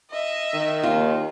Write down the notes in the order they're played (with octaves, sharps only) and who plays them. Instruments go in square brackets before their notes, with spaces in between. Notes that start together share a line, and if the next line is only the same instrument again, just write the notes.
[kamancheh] D#5 E5
[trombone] D#3
[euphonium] D#2 [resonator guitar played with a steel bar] F4